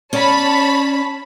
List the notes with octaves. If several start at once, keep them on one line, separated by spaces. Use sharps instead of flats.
C#4 C#5 D5 A5 B5